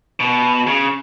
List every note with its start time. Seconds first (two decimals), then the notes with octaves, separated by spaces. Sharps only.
0.20 B2
0.67 C#3